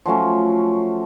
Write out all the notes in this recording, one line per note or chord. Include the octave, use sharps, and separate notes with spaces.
F3 F#3 A3 C#4